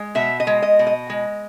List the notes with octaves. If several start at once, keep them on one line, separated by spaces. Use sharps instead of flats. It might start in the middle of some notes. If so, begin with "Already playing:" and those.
Already playing: G#3
B2 E5
D#5
G#3
D#5
B2
D#5
G#3